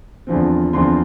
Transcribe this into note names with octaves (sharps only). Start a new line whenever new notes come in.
E2 D3 F3 C4
E2 D3 F3 C4 C6